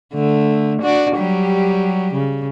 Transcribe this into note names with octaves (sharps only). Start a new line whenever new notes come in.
D3 A3
D4 F#4 D5
F#3 G3 G4
C#3